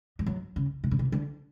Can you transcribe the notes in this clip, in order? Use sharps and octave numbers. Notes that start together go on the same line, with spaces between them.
F3
F#3
C#3
C3
C#3
C3
D3